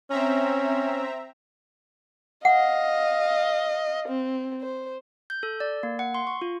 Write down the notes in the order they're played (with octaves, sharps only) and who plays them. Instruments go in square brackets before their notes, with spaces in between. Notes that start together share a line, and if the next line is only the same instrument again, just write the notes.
[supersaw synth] C4 E5 A#5 [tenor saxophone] C#4
[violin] D#5 F5 [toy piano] F#5
[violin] C4
C5
[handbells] G6
A4
D5
A#3
F#5
C6
C#6
F4